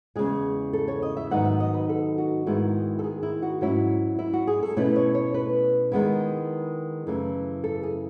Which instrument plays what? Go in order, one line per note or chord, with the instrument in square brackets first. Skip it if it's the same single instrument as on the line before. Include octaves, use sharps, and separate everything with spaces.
[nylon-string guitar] E2 C#3 G#3 G#4
A4
C#5
D#5
E5
G#2 D#3 F#3 B3 D#4 F#5
E5
D#5
B4
A4
F#4
G#2 D#3 G#3 B3 E4
A4
G#4
E4
F#4
G#2 F#3 C#4 E4 F#4
E4
F#4
G#4
A4
B2 A3 C#4 E4 B4
C#5
C#5
B4
D#3 G#3 B3 E4
F#2 C#3 E3 A3
A4
G#4